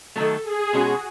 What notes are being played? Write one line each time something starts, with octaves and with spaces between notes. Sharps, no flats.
D#3 F#3 A3 A4
G#4
B2 G#3 C#4 F#4 G#4